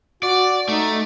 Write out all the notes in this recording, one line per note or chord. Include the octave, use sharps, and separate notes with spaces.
F#4 D5
A3 D#4